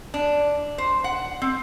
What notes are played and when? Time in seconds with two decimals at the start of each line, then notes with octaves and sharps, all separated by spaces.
0.14 D4
0.78 C5
1.04 F#5
1.42 C4